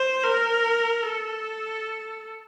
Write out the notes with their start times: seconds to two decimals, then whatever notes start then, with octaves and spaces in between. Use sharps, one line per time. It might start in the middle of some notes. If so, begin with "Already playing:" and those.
Already playing: C5
0.24 A#4
1.03 A4